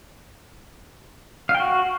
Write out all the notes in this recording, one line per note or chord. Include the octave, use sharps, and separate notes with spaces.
F5
G5
F#4